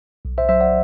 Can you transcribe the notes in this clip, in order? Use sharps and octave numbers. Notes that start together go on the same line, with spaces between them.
B1
C5 E5
F#3 C5 E5
D5 F#5